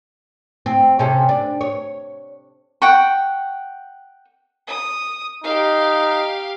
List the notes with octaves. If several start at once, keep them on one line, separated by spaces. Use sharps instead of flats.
C4
C3 C#4 A4
D4
C#5
F#5 G5 C#6
D#6
D#4 G4 F5